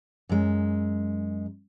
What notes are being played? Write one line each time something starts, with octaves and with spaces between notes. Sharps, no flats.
F#2 G#3